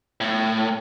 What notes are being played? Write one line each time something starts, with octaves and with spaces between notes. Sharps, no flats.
A2